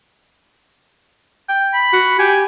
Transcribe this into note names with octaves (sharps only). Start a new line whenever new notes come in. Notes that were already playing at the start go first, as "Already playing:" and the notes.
G5
B5
F#4
G4 G#5